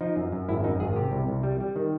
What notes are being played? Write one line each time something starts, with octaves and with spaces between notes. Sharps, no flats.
F3 D#4
F#2
F#2
G#1 E4
F#2 D#4
G#1 G#4
C3 G4
C2
C2
G3
G3
D#3